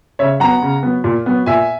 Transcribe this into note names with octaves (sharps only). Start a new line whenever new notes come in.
C#3 C#5 E5
F#3 B3 F#5 A#5
C#3
F#3 B3
A#2
F#3 B3
A#2 E5 G#5